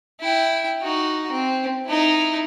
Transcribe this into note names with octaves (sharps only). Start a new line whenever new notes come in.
E4 G5
D#4 F#4
C4
D#4 E4